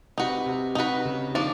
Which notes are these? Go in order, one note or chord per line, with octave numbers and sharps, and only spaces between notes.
C3 D#4 F#4 B4
C3
C3 D#4 F#4 B4
C#3
D#3 F3 A#3 D4